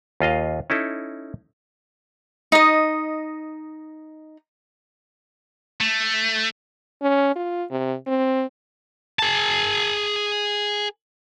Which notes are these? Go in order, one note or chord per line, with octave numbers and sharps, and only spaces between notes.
D#2 F4 D#5 F5
C#4 D#4 E4 A4
D#4 D#5
A3
C#4
F4
C3
C4
G#4 A5